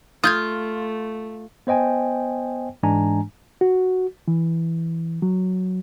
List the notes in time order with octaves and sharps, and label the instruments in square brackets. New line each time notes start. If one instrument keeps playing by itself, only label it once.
[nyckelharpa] A3 [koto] F4 [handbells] D#6 G6 G#6
[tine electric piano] B3 C5 D#5 G5 G#5
G#2 E3 G#3 D4 G#5 A#5
[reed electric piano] F#4
E3
F#3